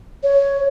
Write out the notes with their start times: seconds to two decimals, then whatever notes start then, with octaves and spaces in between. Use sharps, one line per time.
0.23 C#5